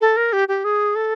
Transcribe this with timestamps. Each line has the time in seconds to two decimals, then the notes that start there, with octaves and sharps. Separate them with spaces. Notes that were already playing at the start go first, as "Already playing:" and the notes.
0.01 A4
0.17 A#4
0.33 G4
0.48 G4
0.64 G#4
0.95 A4